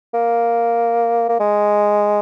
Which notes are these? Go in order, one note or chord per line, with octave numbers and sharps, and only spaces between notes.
A#3
A#3
G#3